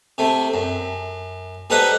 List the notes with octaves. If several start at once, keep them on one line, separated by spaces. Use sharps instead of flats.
C3 A3
F#2
G3 D#4 A4 B4 C5 F#5